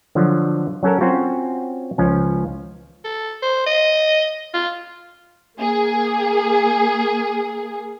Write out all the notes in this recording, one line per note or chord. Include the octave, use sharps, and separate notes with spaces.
D3 F3 F#3
F#3 C#4 A4 A#4
C4 C#4 F4 F#4
C#2 F3 C#4
A4
C5
D#5
F4
A#3 G#4